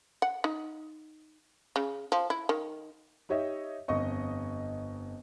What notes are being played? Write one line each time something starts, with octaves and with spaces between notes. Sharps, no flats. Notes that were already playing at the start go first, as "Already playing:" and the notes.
F#5
D#4
C#3
F3
E4
D#3
D#4 G4 C#5 D#5 E5
G1 F2 D#5 C#6